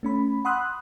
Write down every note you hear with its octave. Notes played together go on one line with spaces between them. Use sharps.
A3 C#4 B5
F#5 B5 C6 D#6 E6 F#6